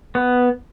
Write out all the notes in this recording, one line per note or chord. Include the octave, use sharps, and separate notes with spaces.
B3